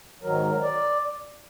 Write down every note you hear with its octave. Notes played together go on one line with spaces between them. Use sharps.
G#2 D#3 F#3 A#4
D5